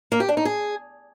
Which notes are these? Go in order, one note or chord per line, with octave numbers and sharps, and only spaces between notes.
A#3
G4
D4
D#4
G#4